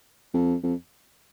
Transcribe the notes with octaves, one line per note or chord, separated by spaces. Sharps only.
F2
F2